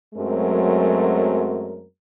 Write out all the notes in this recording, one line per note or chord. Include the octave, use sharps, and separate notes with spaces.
F#2 F#3 G#3 A3 C4 A#4